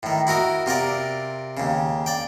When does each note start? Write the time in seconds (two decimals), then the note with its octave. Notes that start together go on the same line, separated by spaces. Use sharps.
0.03 A2 D#3
0.27 E4 F#4 A#4 D#5
0.66 C3 F4 A#4 D5
1.57 D#2 C#3
2.06 D5 G5